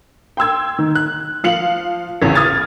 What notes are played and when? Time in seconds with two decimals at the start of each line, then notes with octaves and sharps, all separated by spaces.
0.37 G5 C6 E6 G#6
0.79 D#3
0.95 F#6
1.44 F3 F5 C#7 F#7
2.22 A1 E2 C#3
2.35 D#6 F6 G#6 A6